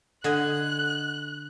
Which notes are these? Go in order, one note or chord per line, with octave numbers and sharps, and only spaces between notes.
D3 D#5 G#5 F#6